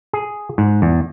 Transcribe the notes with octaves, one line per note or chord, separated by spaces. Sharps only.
G#4
G#2
E2